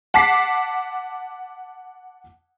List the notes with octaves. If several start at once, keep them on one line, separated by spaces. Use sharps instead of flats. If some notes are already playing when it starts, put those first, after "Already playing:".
F#5 A5 D6 B6 C7